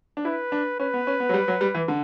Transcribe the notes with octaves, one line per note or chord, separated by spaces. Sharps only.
D4
E4 B4
D4
C#4 B4
B3
C#4
B3
F#3
G3
F#3
G3
E3
D3